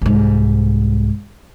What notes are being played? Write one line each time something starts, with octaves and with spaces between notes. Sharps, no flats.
C2 G#2